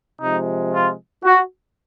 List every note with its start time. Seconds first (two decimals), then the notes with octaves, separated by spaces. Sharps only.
0.22 C3 F3 G#3 D#4
0.73 F4
1.24 F#4